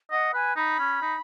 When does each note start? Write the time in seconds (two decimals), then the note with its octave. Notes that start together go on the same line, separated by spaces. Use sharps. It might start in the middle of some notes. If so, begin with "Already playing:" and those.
0.11 D#5 F#5
0.34 B4 G#5
0.56 D#4 B5
0.79 C#4
1.02 D#4